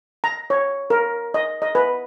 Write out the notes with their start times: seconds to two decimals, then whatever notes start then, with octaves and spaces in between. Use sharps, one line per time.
0.24 A#5
0.50 C#5
0.90 A#4
1.34 D#5
1.62 D#5
1.75 B4